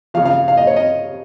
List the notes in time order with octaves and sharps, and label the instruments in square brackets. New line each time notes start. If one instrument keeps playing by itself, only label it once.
[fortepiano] C#3 F3 F5
F5
F5
D#5
C#5
D#5